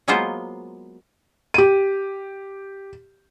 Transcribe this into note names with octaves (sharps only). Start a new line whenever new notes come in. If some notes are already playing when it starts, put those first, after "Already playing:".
F#3 G#3 A#3 B3 F4 C5
G4 D#7